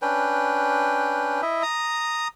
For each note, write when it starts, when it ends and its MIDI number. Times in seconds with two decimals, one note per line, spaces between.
0.02 1.41 61
0.02 1.41 62
0.02 1.41 71
0.02 1.41 79
1.42 1.63 64
1.42 1.63 75
1.42 1.63 76
1.63 2.28 82
1.63 2.28 87